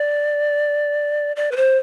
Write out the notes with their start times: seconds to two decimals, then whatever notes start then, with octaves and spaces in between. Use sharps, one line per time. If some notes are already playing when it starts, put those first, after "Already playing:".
Already playing: D5
1.36 D5
1.52 B4
1.57 C5